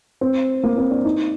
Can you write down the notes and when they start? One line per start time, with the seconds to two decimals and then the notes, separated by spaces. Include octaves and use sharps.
0.21 C4
0.64 A#3
0.78 C4
0.91 D4
1.05 D#4